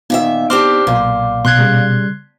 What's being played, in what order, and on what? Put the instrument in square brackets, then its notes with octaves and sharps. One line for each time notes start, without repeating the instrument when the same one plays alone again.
[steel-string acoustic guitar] A#2 D#3 E5 [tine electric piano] B3 D#4
[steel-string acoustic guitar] C4 D4 G4 [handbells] C6 D6 F6
[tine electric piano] B1 [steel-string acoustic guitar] A#2
[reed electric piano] B2 [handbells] C6 F#6 G#6
[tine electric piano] C#3 G3